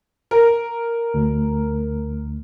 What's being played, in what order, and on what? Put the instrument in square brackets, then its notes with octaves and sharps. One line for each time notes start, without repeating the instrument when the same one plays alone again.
[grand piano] A#4
[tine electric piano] D2